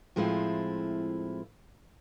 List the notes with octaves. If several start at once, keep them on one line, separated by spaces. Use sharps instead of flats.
A2 F3 G#3 C4 E4 F4